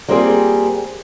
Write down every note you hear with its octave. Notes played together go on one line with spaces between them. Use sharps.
G3 A#3 C4 F4 G#4